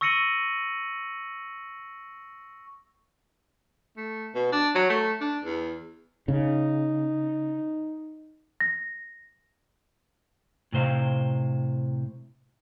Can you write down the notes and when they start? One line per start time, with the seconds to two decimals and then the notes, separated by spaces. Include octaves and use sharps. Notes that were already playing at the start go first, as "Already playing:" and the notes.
0.01 C#6 E6 A#6 C#7 D#7 F#7
3.97 A3
4.35 B2
4.52 D4
4.75 F#3
4.90 A3
5.21 D4
5.44 E2
6.28 C#3 D#4
8.60 A#6
10.72 A2 C3 C5 F5